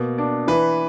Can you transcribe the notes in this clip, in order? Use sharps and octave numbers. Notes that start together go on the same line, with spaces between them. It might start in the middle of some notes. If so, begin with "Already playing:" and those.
Already playing: B2 A#3
D4
E3 B4